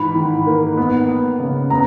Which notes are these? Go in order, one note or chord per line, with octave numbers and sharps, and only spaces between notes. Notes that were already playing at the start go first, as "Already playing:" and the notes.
Already playing: G#2 E3 B5
D#3
A#3
B3
B3
C#3
B3 A#5